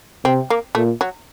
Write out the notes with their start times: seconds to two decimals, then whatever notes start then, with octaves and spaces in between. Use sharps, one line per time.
0.24 C3 C4
0.50 A#3
0.75 A#2 A3
1.01 F#3